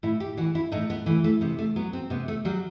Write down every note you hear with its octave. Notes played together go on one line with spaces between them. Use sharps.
A2 E4
G4
E3 F#4
E4
A2 D#4
B3
E3 A3
A3
C3 B3
A3
F#3 B3
C4
C3 B3
A3
F#3 G3